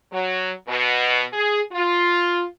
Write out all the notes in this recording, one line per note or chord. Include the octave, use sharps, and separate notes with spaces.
F#3
B2
G#4
F4